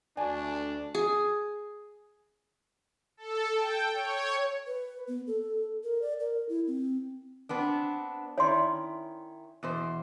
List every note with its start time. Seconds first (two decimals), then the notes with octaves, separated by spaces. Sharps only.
0.17 D2 D4 D5 G#5 A5 C#6
0.95 G#4
3.17 A4
3.55 G5
3.94 C#5
4.67 B4
5.08 B3
5.27 A4
5.84 A#4
6.02 D5
6.20 A#4
6.49 E4
6.67 C4
7.49 B3 C4 D4
8.38 D#3 C#4 E4 C#5 D5 C6
9.63 E2 B2 C5